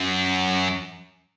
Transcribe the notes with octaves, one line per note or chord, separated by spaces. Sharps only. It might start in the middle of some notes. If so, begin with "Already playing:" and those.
Already playing: F#2